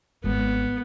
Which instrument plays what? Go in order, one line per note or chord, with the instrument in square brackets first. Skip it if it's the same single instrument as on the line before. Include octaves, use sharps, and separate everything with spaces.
[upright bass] G#1 G#3 [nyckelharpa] B3